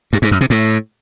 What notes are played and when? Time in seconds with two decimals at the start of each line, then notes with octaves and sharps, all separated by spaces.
0.13 G2
0.22 G#2
0.31 F#2
0.41 C3
0.50 A2